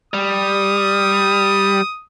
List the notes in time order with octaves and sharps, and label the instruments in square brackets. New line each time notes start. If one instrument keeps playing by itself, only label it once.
[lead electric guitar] G3 [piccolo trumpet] D#6